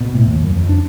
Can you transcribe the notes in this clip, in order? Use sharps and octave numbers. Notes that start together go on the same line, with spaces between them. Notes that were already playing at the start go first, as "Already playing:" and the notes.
B2
A2
D#2
F#2
F2
D4